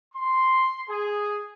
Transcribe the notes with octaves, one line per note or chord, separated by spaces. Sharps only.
C6
G#4